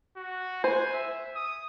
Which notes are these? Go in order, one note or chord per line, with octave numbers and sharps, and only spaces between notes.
F#4
C5 G#5
E5
D#6